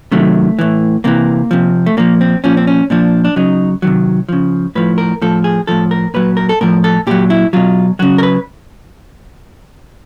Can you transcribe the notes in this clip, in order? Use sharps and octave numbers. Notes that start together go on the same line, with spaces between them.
C3 D#3 F#3 A3
A2 E3
C3 E3 A#3
C3 F3
A3
A#2 F3 A#3
C4
A#2 F3 C#4
C4
C#4
A#2 F3 D4
D4
C#3 F#3 D#4
C3 D#3 F#3
C#3 F3
A2 F3 B4
A#4
A2 F3 A4
G#4
A2 F3 A4
A#4
A#2 F#3 B4
A#4
A4
A2 F3 A#4
A4
A#2 F#3 G4
E4
B2 F#3 F4
C#3 F#3 F#4
A#4
B4